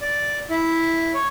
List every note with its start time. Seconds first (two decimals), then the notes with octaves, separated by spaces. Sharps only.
0.01 D5
0.50 E4
1.14 C#5